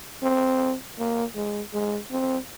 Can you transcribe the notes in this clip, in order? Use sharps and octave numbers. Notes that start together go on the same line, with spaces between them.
C4
A#3
G#3
G#3
C4